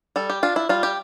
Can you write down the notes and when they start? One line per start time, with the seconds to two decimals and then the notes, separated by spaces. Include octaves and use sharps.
0.16 G3 A4
0.30 G4
0.43 D4 F4
0.56 E4
0.69 G3 F4
0.83 G4